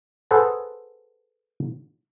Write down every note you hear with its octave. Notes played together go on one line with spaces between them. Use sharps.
G#4 A4 B4 C5 F#5 A5